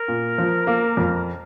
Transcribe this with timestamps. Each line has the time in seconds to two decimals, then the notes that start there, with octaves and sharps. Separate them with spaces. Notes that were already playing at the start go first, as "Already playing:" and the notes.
Already playing: A#4
0.08 A#2
0.38 F3
0.67 A#3
0.97 F2